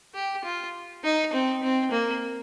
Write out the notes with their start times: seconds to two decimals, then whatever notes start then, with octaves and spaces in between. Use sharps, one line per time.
0.15 G4
0.44 F4
1.04 D#4
1.33 C4
1.63 C4
1.92 A#3